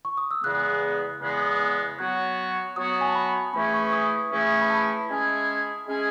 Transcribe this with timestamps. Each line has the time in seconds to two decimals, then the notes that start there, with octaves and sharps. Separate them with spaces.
0.05 C#6
0.17 D#6
0.31 E6
0.43 E2 C#3 G#3 B3 F#6
1.21 E2 C#3 G#3 B3
1.99 F#3 B3 F#4 C#5 F#6
2.76 F#3 B3 F#4 C#5 D#6
3.01 G#5
3.08 A5
3.15 B5
3.54 E3 A3 C#4 E4 G#4 B5
3.74 C#6
3.93 D#6
4.32 E3 A3 C#4 E4 G#4
4.62 B5
4.70 A5
5.09 G#3 C#4 E4 G#4
5.86 G#3 C#4 E4 G#4